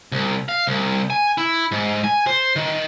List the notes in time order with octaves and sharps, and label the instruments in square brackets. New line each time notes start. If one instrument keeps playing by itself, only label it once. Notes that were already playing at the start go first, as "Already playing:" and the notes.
[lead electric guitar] C2
F5
C2
G#5
E4
G#2
G#5
C5
D#3